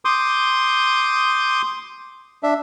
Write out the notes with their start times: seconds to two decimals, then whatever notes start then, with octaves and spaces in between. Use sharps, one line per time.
0.05 C6 D6 D#6 G6
2.43 D4 E5